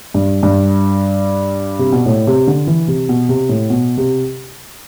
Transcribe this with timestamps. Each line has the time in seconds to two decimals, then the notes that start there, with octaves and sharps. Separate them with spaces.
0.14 G2
0.43 G2
1.79 C3
1.93 B2
2.06 A2
2.27 C3
2.47 D3
2.67 E3
2.88 C3
3.09 B2
3.29 C3
3.49 A2
3.70 B2
3.97 C3